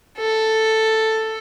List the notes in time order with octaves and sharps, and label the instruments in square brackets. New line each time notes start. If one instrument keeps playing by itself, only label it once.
[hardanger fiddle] A4